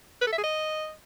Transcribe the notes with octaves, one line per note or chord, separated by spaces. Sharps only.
B4
A4
E5
G#4
D#5